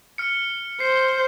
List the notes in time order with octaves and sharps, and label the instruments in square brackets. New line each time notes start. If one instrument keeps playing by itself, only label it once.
[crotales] F6 C#7
[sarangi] C5 [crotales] C7